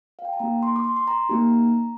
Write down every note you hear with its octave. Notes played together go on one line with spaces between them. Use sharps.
F5
G5
A5
A#3 D#4 G4 A#5
C6
D6
C6
C6
A#5
A#3 D#4 G4